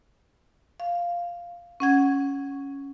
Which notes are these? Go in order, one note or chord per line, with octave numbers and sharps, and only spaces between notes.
F5
C#4 F#5 G#6